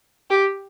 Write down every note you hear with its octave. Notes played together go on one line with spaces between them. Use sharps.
G4